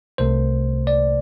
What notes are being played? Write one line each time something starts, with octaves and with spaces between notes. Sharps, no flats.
C2 C3 A3 C5
D5